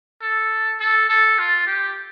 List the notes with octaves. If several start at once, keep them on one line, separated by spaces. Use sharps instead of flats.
A4
A4
A4
F4
G4